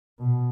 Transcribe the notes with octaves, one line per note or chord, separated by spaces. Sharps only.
B2